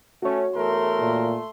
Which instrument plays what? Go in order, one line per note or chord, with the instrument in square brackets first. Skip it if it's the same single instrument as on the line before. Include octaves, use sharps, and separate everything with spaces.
[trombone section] A3 C#4 [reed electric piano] F#4 C#5
[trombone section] E2 A#4 [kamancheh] A3 C6
[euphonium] A#2